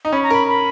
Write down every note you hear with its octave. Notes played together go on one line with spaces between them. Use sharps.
D#4
C#4 B5
A#5
A#4 B5
B5